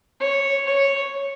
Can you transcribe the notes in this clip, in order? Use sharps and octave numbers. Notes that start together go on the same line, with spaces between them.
C#5
C#5